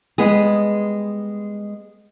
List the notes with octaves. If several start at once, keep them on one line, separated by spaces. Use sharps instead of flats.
G3 G#3 B3 G#4